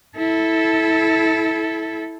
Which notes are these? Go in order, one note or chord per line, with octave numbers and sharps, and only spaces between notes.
E4 A4